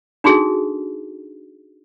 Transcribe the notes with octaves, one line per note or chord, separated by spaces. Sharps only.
D4 D#4 F#4 G#4 A4